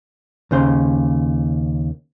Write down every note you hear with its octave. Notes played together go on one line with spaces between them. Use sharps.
D#2 C#3 C5